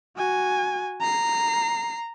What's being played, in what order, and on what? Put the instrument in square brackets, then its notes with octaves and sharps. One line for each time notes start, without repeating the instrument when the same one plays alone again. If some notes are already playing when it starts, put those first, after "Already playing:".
[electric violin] F#4 G#5
A#5 C7